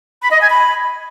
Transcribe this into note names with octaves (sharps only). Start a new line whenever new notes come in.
B5
D#5
G#5
B5